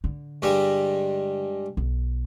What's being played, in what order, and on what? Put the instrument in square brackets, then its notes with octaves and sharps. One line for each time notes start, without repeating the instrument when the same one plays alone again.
[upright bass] D3
[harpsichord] G2 G3 G#3
[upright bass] B1